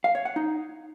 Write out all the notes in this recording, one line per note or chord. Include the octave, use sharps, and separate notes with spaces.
F5
C#5
F#5
D#4